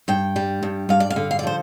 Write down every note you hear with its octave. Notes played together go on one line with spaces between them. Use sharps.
G2 G5
G3
G2
G2 F5
D5
F5
D3
F5
D5
F3 C5